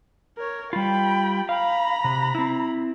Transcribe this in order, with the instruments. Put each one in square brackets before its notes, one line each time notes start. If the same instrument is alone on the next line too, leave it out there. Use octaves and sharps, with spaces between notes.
[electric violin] A#4 C#5
[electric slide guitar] G3 F4 [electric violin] G5 B5
[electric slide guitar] F5 [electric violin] A#5 B5
[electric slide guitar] C3
C4 E4